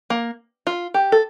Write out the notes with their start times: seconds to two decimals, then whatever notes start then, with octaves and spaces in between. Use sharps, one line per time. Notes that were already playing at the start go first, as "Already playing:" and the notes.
0.10 A#3
0.67 F4
0.94 G4
1.12 A4